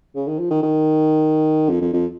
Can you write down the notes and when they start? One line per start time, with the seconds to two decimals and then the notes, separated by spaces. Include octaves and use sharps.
0.16 C#3
0.28 D#3
0.39 F3
0.51 D#3
0.63 D#3
1.70 F2
1.81 F2
1.93 F2